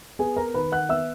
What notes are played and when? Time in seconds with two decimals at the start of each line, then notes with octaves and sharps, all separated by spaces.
0.19 B3 G#4 G#5
0.36 A#4 A#5
0.54 D#3 B4 B5
0.72 F#5 F#6
0.89 B3 E5 E6